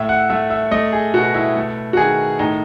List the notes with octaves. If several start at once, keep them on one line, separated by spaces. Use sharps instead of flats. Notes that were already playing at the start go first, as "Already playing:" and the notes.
Already playing: A2 A3 E5
F#5
A3 E5
E5
A3 D#5
G#4
B2 F#4
E4
A3
F#4
D#3 G#4
A2 D#4